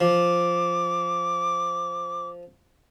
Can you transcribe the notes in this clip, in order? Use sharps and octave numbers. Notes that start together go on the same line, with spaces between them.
F3 D6